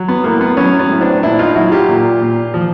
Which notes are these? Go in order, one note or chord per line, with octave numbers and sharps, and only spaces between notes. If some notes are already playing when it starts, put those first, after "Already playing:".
Already playing: F#3
B3
A2 A#3
B3
F#3 B3 C#4
B3 C#4
A2
C4 D4
A#2 D4 E4
D#4 F4
F#3 E4 F#4
F4 G4
A#2
A#2
F3